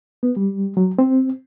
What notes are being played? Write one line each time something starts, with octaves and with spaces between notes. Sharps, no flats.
B3
G3
F#3
C4